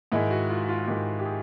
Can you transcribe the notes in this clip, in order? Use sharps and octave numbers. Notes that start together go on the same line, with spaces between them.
G#2 D#3 G#3 E4
F#4
F4
F4
G#2 D#3 G#3 G4
G4
G#4